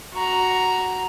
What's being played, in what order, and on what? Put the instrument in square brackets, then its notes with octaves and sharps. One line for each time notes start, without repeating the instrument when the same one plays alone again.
[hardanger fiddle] F#4 A#5